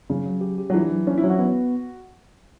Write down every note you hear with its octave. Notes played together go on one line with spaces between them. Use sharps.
C#3 F#3
F#3
G4
G4
F#3
E3 D4
F#3
C#4 D4
E4
F#3
F#4
B3